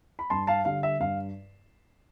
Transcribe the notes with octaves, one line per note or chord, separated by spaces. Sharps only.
B5
G2 A5 C6
F5 A5
D3 G3 F5
E5
G2 F5